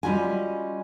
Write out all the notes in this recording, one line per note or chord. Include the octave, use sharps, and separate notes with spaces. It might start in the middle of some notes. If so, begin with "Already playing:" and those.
G3 G#3 C#4 F4 F#4 G#5